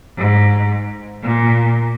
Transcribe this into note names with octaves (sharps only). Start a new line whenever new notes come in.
G#2
A#2